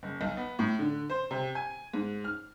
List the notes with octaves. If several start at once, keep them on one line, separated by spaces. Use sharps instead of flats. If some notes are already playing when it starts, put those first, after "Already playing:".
F#1
B1
B3
A2
D3
C5
C3
G#5
G#2
F6